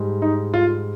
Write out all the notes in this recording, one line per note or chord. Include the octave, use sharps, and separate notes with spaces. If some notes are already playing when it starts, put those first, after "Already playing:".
Already playing: G#2 G3
D#4
F4